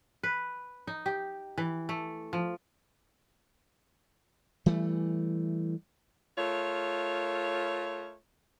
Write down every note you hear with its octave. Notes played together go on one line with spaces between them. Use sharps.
B4
D#4
G4
E3
A3
F3
E3 G3 A3
A3 F4 A#4 C#5